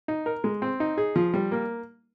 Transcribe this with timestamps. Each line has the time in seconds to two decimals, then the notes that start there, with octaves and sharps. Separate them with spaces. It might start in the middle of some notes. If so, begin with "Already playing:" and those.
0.08 D#4
0.26 A#4
0.44 G#3
0.62 C4
0.80 D#4
0.98 G#4
1.16 F3
1.34 G3
1.52 A#3